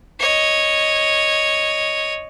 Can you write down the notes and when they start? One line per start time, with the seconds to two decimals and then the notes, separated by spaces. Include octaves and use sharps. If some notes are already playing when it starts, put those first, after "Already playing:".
0.20 C#5 D#5